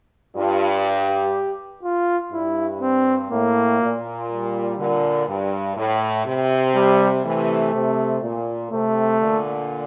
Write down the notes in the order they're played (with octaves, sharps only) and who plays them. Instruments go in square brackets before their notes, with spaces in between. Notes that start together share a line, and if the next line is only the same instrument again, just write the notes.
[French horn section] G2 [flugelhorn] F4
[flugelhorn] G4
F4
[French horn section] G2 [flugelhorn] E4
[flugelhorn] C4
[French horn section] A2 [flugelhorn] A#3
[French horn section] A#2
[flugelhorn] G3
[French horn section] A#2 D3
G2
A2
C3
[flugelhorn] G3
[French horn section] C3 E3 [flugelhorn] A3
[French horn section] C3
A#2
[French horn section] C3 [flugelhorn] A3
[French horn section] A#2 D3